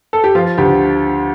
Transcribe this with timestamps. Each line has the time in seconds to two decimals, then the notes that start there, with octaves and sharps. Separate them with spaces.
0.13 A4
0.24 G4
0.35 F3 F4
0.58 D2 G4